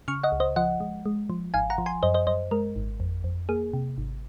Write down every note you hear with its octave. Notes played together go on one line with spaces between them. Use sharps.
C#3 C#6 F6
D#5 F#5
C#2
C5 D#5
F3 D#5 F#5
G#3
G#3
F3
G#1 F5 G#5
F#5 A#5
F3
G#5 C6
F#2 C5 D#5
C5 D#5
F#2 C5 D#5
G#3 A#4
G#1
F2
F2
A#3 G#4
C3
G#1